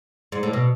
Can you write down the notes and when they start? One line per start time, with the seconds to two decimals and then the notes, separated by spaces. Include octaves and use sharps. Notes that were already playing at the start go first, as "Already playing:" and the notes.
0.32 G#2
0.43 A2
0.53 B2